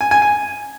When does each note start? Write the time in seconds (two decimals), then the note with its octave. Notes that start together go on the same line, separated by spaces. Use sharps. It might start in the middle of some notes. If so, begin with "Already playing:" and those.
0.01 G#5
0.11 G#5
0.22 G#5